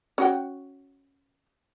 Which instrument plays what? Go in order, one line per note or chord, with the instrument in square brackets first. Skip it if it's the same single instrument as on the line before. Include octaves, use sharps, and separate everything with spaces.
[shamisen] C#4 F#4 G5